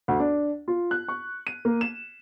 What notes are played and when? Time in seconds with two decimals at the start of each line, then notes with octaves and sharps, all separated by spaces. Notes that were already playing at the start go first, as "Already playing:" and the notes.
0.08 D2
0.20 D4
0.68 F4
0.91 F#6
1.08 C#6
1.47 D#7
1.65 A#3
1.81 E7